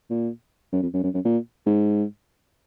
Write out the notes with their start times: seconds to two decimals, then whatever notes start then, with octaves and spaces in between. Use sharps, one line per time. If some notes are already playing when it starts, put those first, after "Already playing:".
0.10 A#2
0.72 F#2
0.82 F2
0.94 F#2
1.04 F#2
1.14 F#2
1.25 A#2
1.66 G#2